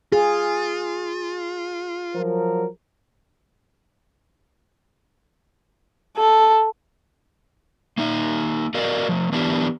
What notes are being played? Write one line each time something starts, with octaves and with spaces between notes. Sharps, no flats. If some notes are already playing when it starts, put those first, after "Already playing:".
F4 G#4
F3 F#3 A#4
A4
A#3 D#4 E5
F#4 A#4 D5 D#5 F5
F3 A3
E3 B3 D4 E4 G4